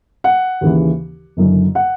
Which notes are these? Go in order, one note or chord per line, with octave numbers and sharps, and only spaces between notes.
F#5
D#2 C#3 E3
F#1 F#2 D3
F#5